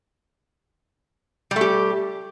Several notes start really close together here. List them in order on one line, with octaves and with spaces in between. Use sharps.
G3 A3 G4